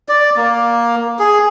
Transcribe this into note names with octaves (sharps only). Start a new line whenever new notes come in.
D5
A#3
G#4